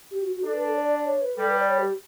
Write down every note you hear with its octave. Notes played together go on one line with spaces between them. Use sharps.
G4
F#4
F#4
D4 A4
B4
A4
D5
D5
D5
C#5
B4
G3 A4
B4
D5
C#5
G4